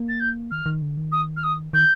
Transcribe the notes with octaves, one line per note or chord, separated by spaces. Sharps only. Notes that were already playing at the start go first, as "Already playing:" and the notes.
Already playing: A#3
A6
G6
D#3 F6
D#3
D3
D#3
D#6
F6
D#6
D#3 G6